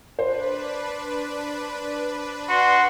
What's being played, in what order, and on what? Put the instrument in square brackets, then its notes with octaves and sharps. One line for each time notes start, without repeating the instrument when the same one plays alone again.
[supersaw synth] D4 B4 [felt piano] C5
[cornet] F#4 [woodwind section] C6